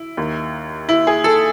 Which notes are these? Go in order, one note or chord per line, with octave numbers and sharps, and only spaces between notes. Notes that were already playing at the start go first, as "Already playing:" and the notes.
Already playing: E4
D#2 D#3
E4
G#4
A4